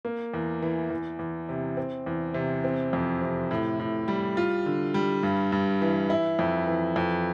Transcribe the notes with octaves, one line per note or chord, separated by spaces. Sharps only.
A#3
E2
E3
E2
E2
C3
C4
E2
C3
C4
F2
C3
A2
A2
G3
F4
D3
G3
G2
G2
E3
E4
F2
E3
F2